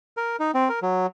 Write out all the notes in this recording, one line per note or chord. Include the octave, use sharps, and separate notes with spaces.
A#4
D#4
C4
A#4
F#3